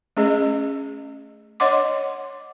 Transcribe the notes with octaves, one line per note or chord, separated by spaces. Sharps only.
A3 C#4 G#4 D#5
C#5 D#5 F#5 C6 D6